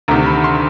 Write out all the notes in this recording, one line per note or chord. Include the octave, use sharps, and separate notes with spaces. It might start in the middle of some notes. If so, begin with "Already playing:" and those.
D2 C3 D#3 A#5
B5
C6